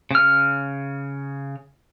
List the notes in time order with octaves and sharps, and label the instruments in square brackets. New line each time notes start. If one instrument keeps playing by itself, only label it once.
[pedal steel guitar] C#3 F6